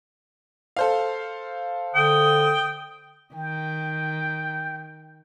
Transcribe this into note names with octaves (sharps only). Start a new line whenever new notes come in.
A4 C5 F5
D3 G5 D#6
D#3 G5